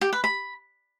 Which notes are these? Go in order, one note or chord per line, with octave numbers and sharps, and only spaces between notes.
G4
B4
B5